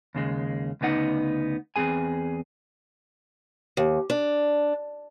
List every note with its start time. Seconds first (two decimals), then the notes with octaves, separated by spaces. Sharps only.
0.15 D#2 C#3 G#3
0.81 D2 C#3 B3 D#4 F#5
1.76 E2 F3 C4 G#4 G#5
3.77 D#2
4.10 D4